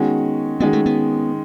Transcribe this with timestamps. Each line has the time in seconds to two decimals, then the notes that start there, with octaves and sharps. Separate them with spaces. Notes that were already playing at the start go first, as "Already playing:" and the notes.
Already playing: D#3 G#3 B3 C#4 F#4
0.60 D#3 G#3 B3 C#4 F#4
0.73 A3
0.86 B3